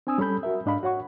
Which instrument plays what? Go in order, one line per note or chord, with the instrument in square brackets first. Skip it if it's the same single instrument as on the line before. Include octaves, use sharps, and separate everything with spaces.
[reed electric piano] C4 D4 G#5 D#6 E6
G3 C#4 A4 B5 G6
F#4 A#4 E5
G#2 D4 D#5 F5 B5
F#4 C#5 F#5 C#6